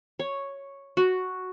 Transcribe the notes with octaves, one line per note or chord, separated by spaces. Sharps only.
C#5
F#4